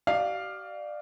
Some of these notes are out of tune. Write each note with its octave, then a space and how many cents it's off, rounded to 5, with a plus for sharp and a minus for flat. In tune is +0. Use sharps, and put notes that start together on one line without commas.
G4 -45 D5 +20 F5 +0